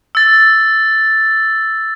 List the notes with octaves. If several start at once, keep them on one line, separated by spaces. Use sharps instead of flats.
E6 A6